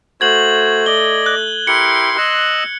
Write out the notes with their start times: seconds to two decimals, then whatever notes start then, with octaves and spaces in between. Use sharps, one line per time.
0.21 A3 F#4 C5 G#6 F#7
0.86 D5 D#5 G7
1.26 F#6
1.67 E4 G4 A#4 C6 C#7
2.18 D#5 E6 F#6